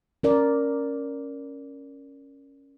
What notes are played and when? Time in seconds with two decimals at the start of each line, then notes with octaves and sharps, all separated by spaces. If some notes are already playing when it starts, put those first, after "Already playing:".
0.23 C#4 A#4 D5